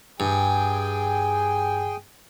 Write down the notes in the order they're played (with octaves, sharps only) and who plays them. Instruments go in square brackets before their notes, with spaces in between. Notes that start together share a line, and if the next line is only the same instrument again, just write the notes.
[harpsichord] G2 [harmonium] G#4 G5 G#5